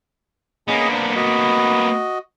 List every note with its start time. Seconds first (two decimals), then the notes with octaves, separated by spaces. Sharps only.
0.68 A#3 B3 C#4 G#4 D#5
0.91 D4 C5
1.15 F#4 D#5